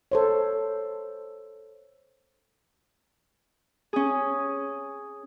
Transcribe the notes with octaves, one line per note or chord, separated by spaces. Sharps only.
A4 C5 C#5
C#4 G#4